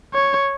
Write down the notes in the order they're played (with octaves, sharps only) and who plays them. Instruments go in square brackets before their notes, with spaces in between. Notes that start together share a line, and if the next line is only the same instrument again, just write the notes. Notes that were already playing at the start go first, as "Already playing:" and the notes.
[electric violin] C#5